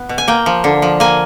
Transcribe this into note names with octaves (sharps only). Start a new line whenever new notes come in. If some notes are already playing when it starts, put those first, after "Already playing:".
Already playing: B3
B2
G#5
A#3 G5
F3
D3
F3
A#3 G#5